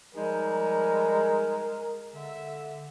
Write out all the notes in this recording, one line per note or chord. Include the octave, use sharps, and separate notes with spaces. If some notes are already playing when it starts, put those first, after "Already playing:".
F3 G3 G#3 D#4 A#4
D3 E5